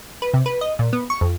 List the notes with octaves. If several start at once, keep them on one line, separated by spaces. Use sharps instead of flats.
B4
C3
B4
D#5
A#2
B3
C#6
F2